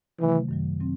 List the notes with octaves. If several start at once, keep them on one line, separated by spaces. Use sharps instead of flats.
C3 D#3 E3 F#3 A3
F#2 D#3 F#3
F#3 C4